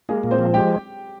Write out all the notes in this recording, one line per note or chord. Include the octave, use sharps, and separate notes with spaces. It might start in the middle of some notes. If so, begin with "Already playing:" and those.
G#3 A#3 G#4
A#2
C4 C5
F3
G#3 G4 G5